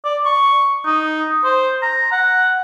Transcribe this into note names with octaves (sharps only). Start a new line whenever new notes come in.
D5
C#6
D#4
C5
A#5
F#5